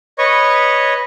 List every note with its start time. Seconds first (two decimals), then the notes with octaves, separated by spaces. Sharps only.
0.18 B4 C#5 D#5 C#6